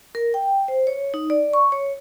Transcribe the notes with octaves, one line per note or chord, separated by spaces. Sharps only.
A#4
G5
C5
C#5
D#4
D5
C#6
C#5